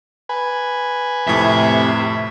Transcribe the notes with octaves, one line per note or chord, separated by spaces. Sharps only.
B4 G#5
F2 A2 C3 E5